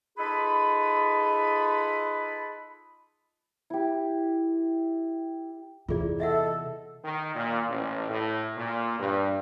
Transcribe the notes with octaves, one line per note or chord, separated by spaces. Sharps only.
D#4 F4 G#4 A4 B4 B5
E4 G4
E2 C3 F4 G#4 D5
A4 D#5 E5 F#5
D#3
A#2
A1
A2
A#2
G2